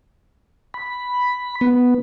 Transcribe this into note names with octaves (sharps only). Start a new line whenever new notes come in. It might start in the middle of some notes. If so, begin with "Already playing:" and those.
B5
B3